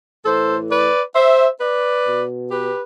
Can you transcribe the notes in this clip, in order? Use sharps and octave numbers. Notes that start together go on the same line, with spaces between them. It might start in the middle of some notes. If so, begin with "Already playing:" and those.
A2 E3 A4 C5
B4 D5
C5 E5
B4 D5
B2
G4 B4